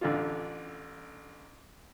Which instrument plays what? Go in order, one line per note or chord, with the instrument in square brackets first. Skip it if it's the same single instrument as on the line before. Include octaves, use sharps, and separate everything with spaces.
[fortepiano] A1 D3 F4